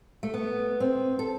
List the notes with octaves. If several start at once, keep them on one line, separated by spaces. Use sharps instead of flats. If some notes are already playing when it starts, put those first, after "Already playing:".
A3
B3
C4
A4